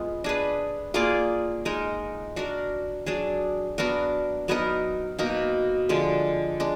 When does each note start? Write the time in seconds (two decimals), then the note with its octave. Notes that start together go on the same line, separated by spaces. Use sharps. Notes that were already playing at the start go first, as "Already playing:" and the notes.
Already playing: G#3 B3 F4 G#4
0.24 D4 G#4 B4
0.94 A#3 F4 G#4 D5
1.65 G#3 D#4 A#4
2.36 D4 F#4 A#4
3.06 F#3 D4 G#4
3.78 B3 D4 F#4 A#4
4.48 F#3 B3 D#4 A#4
5.19 B2 A#3 D#4 A#4
5.89 D3 F3 G#3
6.60 G#3 D4